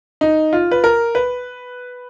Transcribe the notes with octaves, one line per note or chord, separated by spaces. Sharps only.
D#4
F4
B4
A#4
B4